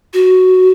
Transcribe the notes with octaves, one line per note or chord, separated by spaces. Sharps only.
F#4